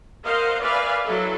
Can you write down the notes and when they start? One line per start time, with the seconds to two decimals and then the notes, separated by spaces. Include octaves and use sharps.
0.25 A#4 C5 D#5 F5 F#5
0.61 B4 D5 E5 F5 G#5 B5
1.06 F#3 E4 A4